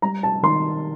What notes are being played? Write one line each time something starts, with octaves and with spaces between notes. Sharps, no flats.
G3 A#5
A5
D#3 C6